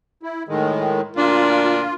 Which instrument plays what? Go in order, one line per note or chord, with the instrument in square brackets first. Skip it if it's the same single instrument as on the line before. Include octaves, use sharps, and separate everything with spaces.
[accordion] E4
A2 D#3 G#3
[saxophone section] D2 A#2 D4 [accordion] F4